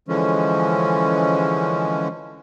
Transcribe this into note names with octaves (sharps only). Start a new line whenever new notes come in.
D3 E3 F3 G#3 C#4